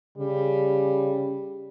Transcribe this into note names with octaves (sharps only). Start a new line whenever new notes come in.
C#3 G3